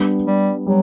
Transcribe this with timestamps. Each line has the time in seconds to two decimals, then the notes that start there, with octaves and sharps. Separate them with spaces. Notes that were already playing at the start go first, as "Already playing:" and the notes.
Already playing: G3 B3 D4
0.27 G3
0.66 F#3 G3